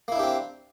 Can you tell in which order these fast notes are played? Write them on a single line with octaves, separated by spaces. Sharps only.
A#3 E4 D4 G4 C4